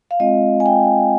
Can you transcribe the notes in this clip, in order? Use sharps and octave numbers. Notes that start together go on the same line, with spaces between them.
F5
G#3 C4 F4 D#5
G#5
G5